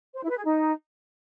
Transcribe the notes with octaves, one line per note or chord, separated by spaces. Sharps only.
C5
E4
B4
G#4
D#4